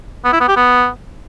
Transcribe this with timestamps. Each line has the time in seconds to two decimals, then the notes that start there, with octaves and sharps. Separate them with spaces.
0.25 B3
0.33 E4
0.40 B3
0.48 G4
0.56 B3